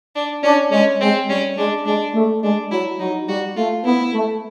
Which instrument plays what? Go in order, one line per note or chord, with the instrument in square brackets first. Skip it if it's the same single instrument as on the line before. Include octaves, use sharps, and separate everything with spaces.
[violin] D4
[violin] C#4 [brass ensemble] D4
[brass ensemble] G#3 [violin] C#4
[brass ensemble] G#3 [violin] C4
[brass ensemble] G3 [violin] C#4
[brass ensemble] G#3 [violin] D4
[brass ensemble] G#3 [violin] D4
[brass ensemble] A3
[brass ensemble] G#3 [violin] D4
[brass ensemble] F#3 [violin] E4
[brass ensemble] F#3 [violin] D#4
[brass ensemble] G3 [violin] F#4
[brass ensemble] A3 [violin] F4
[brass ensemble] B3 [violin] E4
[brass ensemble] A3